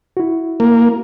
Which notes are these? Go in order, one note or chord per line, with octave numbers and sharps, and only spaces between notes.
E4 F#4
A#3